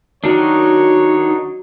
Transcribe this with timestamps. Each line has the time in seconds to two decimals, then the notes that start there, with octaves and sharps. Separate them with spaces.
0.24 D#3 F#3 D4 D#4 F#4 C#5